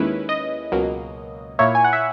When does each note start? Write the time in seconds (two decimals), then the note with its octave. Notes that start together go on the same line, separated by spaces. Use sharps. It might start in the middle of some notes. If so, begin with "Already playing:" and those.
Already playing: D#2 D#3 G#3 C#4 E4 B4
0.29 D#5
0.72 C#2 B2 F#3 A#3
1.59 A#2 A#3 E4 C#5
1.75 G#5
1.84 F#5
1.93 E5